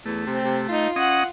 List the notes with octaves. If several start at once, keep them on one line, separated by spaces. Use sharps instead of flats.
E2 A3
C3 C4
C3
D#4 F4
C#4 D#5 F#5 D#6